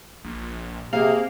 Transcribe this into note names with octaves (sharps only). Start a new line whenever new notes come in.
A#1
C3 A#3 G#4 F5